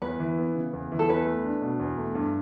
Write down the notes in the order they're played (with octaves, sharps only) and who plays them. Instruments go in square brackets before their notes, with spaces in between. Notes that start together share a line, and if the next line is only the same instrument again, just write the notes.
[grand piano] E2 [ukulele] B4
[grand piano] E3
B3
C#3
E2
E3
[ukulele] A4
[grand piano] E2 [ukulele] B4
[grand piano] A3
D4
B2
E2
A3
G2